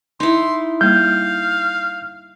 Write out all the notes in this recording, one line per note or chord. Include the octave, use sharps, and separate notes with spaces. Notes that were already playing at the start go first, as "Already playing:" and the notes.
D#4 E4 C6
G3 A#3 F5 G6